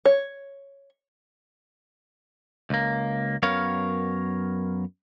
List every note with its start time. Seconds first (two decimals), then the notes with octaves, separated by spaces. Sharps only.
0.05 C#5
2.70 C#2 A#3
3.43 F#2 B3 A#4 C#5 F5